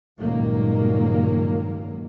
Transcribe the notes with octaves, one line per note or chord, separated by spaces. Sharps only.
C#2 G2 A#2 D#3 F#3 A#3